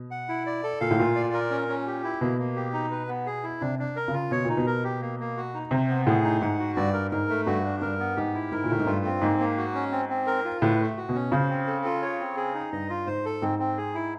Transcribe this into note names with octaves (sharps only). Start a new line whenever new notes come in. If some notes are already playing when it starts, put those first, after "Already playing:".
Already playing: B2
F#5
E4
D5
A4
A#2 F5
A2
A#2 F4
D5
A#4
C#4
C#4
G4
E4
B2 A#3
A#3
G4
D#4
B4
B3
G#4
E4
C3 D4
D4
A#4
C#3
F4
B2 C#5
A#2 D#4
B2
A#4
G4
A#3
A#3
F#4
D#4
C3 C5
B3
A2 G#4
D#4
G#2 F#5
F#4
G2 D5
A#4
G#2 A#4
A3
G2 F#4
D4
G2 A#4
B3
G#2 G4
E4
G#2 A#4
A#2
A2 A3
G#2
G2 F4
C4
G#2 A#3
A#3
F#4
C#4
C4
C4
A#4
F4
A2 B4
A3
F#4
B2
C#4
C#3 C5
C4
A4
F4
C#5
C4
G#4
D#4
G2 D#5
F4
G#2 C5
A4
G#2 C4
C4
G#4
E4